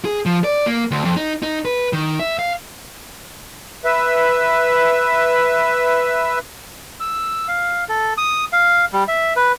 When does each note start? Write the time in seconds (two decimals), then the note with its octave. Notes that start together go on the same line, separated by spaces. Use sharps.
0.05 G#4
0.26 F3
0.44 D5
0.66 A#3
0.91 D2
1.05 F2
1.16 D#4
1.43 D#4
1.65 B4
1.93 D#3
2.20 E5
2.39 F5
3.85 B4 E5
7.00 E6
7.48 F5
7.89 A4
8.18 D#6
8.53 F5
8.93 G3
9.08 E5
9.36 B4